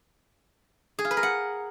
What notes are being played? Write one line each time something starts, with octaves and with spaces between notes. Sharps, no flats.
G#4
F4
B4
A#4
F#5